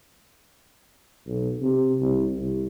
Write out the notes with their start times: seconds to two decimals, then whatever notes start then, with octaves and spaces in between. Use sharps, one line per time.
1.27 B1
1.61 C3
2.01 C2
2.37 C2